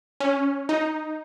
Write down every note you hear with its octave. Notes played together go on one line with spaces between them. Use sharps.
C#4
D#4